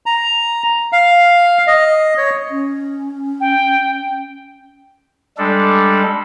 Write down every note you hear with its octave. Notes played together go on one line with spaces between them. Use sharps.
A#5
F5
D#5
C#5
C#4
G5
G3 G#3 D4 A4